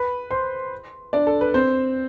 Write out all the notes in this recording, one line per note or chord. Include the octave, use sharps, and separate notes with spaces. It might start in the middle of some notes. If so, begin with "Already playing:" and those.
Already playing: B4 B5
C5 C6
D4 D5
A4
B4
C4 C5